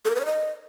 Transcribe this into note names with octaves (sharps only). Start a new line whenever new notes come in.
A4
A#4
B4
C#5
D#5